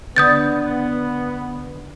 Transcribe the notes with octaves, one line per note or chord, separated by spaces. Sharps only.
D3 B3 D#6 G6 A6